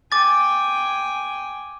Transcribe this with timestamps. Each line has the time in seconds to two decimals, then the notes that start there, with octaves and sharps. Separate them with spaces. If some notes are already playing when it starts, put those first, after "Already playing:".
0.12 G5 G#5 D6 A6